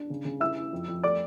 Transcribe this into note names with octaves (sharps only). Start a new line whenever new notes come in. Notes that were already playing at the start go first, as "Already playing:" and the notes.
Already playing: D4
C#3
C#3
E4 E5 E6
E4
F2
F2
A3 D5 D6